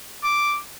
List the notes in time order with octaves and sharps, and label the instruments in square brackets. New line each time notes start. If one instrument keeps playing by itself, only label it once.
[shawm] D6